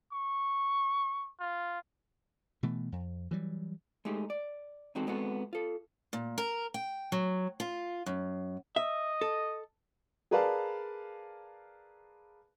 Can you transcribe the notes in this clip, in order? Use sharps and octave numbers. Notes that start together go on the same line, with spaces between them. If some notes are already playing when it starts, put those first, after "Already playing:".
C#6
F4
B2 E3 A3
F2
E3 F#3 G3
G#3 A3 D#4 G4 G#4
D5
E2 G#3 C4 D#4 F#4 A4
G#3 B3 C4 F#4 A4
F4 A4
A#2
A#4
G5
F#3
F4
F#2
D#5 E5
A4
G#4 A#4 B4 D5 F5 A5